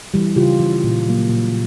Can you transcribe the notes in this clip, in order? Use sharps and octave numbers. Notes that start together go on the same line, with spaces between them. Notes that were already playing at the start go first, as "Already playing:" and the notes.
E3 G3
C#3 F4 G4
E3 G3
A#2
F#3 A#3
A#2